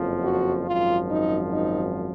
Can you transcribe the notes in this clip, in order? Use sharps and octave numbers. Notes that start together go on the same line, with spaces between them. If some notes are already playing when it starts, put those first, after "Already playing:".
Already playing: F#1 F2 F3
F#4
G#1 F#2 F3 F4
D#4
D#4